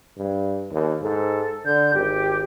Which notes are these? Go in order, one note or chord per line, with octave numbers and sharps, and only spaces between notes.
G2
D#2
G#2 A4
D3 G6
G#1 G4